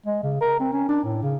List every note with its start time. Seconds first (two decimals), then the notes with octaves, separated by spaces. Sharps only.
0.06 G#3
0.23 C#3
0.41 A#4
0.60 C4
0.72 C#4
0.89 D4
1.04 A2
1.22 C#3